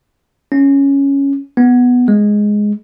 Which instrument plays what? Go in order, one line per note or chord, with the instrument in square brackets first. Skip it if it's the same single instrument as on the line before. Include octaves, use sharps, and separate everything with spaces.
[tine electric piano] C#4
B3
G#3